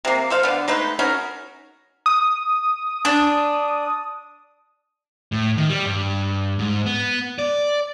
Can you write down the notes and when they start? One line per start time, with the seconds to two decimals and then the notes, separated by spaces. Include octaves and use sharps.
0.05 C3 A#3
0.30 A4 C5 F5
0.43 D3 B3
0.68 G#3 A3 D#4 B4
0.99 C#4 D#4 F#4 A#4
2.06 D#6
3.05 D4
5.32 A2
5.57 D#3
5.69 G3
5.86 G2
6.59 G#2
6.86 B3
7.39 D5